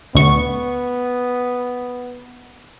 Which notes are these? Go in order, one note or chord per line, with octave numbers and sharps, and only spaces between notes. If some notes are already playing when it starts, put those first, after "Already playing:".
D2 B3 C#6